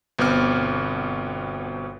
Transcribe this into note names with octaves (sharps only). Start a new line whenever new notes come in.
G1 B2 B3 C4 D6 F6